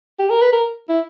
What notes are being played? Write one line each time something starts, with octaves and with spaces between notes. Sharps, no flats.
G4
A#4
B4
A#4
E4